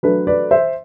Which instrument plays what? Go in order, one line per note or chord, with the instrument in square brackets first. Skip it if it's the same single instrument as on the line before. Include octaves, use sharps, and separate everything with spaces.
[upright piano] F#3 A3 D4 B4
B4 D5
C5 E5